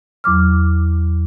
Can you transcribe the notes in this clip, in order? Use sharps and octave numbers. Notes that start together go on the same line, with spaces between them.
E2 F#3 D6 F6